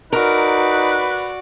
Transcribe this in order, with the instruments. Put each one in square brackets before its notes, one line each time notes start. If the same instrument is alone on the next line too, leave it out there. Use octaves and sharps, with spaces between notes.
[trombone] D#4 [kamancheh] F#4 D5 [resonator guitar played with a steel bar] A#4 [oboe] B4